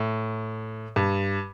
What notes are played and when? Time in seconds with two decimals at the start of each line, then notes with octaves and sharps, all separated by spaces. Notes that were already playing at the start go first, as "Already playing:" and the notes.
Already playing: A2
0.96 G2